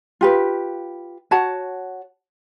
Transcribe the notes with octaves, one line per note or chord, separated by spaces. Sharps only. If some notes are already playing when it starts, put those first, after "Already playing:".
F4 G4 B4
F#4 C#5 F#5 A5